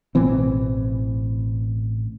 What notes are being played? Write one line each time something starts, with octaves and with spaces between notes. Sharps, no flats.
A1 B2 E3 C4